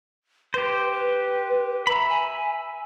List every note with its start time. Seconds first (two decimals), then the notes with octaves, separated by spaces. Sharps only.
0.54 G4 B4 C5
0.92 B4
1.87 E5 A#5 B5
2.09 G#5